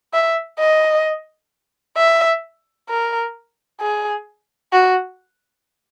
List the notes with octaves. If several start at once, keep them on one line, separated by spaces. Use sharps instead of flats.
E5
D#5
E5
A#4
G#4
F#4